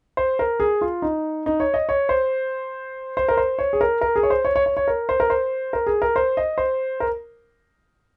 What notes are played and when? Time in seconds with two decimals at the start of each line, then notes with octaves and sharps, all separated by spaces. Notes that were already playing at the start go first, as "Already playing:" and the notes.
0.17 C5
0.39 A#4
0.60 G#4
0.81 F4
1.02 D#4
1.46 D#4
1.60 C#5
1.74 D#5
1.89 C#5
2.09 C5
3.17 C5
3.28 A#4
3.37 C5
3.59 C#5
3.73 G#4
3.81 A#4
4.01 A#4
4.16 G#4
4.23 C#5
4.30 C5
4.45 C#5
4.56 C#5
4.66 C#5
4.77 C#5
4.88 A#4
5.09 C5
5.20 A#4
5.30 C5
5.73 A#4
5.87 G#4
6.02 A#4
6.16 C5
6.37 D#5
6.58 C5
7.00 A#4